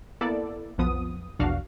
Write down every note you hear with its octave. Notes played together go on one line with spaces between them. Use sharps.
A#3 B3 E4 A4 D5
B1 F2 F3 B3 D#6
A#1 E2 B2 D4 F#4 F5